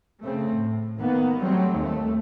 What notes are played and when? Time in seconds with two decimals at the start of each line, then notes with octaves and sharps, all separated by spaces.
0.23 C#3 A3 C4
0.53 A2
0.99 D#3 A#3 B3
1.40 F#3 G3 A3 C4
1.74 D#2 A3